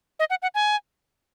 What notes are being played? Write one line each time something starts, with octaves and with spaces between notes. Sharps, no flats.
D#5
F#5
F#5
G#5